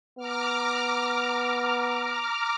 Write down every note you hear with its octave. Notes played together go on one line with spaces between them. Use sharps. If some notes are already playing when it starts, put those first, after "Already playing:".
B3 A#5 D6 F6